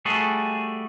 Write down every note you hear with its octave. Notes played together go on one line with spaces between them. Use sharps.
G3 A3 F#4 G#4 A4